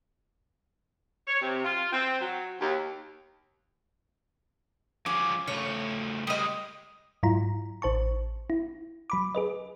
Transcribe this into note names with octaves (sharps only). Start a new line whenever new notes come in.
C#5
C3
F4
C4
F#3
D#2
F3 C#4 G#4 D6
C#3 A3 C#5
G3 G#3 D#5 D#6
G#2 F#3 E4 F4 A#5
A1 C5 A5 C#6
E4
F#3 B5 D6
G#4 B4 D#5